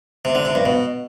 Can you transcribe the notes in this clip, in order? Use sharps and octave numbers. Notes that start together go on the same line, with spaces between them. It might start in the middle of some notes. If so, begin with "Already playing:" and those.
C3
D3
C3
G2
B2